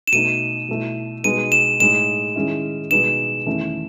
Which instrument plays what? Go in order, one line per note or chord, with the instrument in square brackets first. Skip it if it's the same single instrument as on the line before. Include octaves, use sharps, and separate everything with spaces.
[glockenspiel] E7
[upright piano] B2 A3 D#4 [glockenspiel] D#7
[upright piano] B2 A3 E4
[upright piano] B2 G#3 B3 D#4 [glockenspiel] D#7
[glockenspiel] E7
[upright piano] A2 G#3 D#4 [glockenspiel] E7
[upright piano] D#3 G#3 C#4 E4
[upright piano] B2 G#3 B3 D#4 [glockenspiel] E7
[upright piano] E2 D#3 A3 C#4 E4